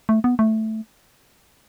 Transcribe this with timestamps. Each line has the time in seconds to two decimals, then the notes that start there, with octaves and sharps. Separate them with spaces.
0.09 A3
0.24 B3
0.39 A3